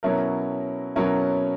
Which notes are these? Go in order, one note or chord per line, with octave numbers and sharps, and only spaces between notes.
B2 F#3 C#4 E4 A#4
B2 F#3 C#4 E4 A#4